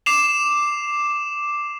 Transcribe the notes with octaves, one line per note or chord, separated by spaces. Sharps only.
D6 C7 E7 F7